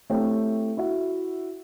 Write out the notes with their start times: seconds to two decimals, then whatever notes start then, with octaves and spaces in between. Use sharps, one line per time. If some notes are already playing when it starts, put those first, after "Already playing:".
0.10 A3 C4 E4 G4 C#5 G5
0.77 E4 F#4 E5